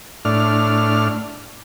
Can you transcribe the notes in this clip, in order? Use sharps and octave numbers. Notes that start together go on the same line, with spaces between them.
A2 D4 F6